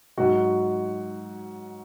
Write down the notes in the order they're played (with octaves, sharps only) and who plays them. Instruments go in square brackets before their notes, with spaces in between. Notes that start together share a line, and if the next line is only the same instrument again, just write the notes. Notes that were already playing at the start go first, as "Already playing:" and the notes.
[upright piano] G#2 F#3 F#4